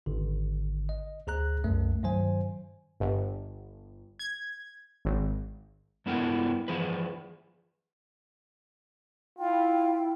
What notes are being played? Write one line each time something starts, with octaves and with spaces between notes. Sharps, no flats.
G#1 D3
D#5
D2 G#4 A#5 F#6
C2 F#2 A3
G2 D#3 F#3 C5 G#5
G1
G#6
G#1
G2 B3 E4 A4 A#4 G5
E3 F3 G#4 B4
E4 F4 G5